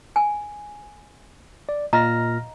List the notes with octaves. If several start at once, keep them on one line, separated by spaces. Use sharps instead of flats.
G#5
D5
A#2 D#5 F5 A#5 F6 A#6